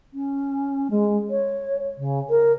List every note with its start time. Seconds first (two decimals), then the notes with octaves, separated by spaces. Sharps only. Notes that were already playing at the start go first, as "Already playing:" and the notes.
0.13 C#4
0.90 G#3
1.30 C#5
1.97 C#3
2.29 A#4